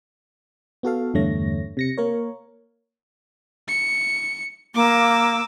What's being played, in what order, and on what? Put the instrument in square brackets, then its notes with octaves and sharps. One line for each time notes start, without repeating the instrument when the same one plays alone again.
[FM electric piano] B3 F#4 A4 F5
E2 G2 D3 A3 C#5 A#6
C3 A#6 C#7
A#3 A#4 C#5
[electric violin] C#7
[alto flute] A#3 [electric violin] D6 E6